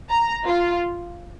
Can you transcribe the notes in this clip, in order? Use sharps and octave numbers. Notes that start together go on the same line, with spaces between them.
A#5
F4